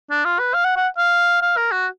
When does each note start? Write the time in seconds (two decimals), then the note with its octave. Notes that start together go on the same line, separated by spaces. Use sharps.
0.10 D4
0.25 F4
0.39 B4
0.54 F5
0.64 F#5
0.76 F#5
0.97 F5
1.42 F5
1.57 A#4
1.72 F#4